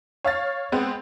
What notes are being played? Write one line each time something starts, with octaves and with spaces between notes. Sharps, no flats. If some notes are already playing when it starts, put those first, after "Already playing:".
C#5 F5 F6 A6
G#3 B3 C4